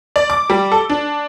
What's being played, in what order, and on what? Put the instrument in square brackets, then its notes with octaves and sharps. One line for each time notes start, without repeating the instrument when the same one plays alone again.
[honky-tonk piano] D5
D6
G3
A4
D4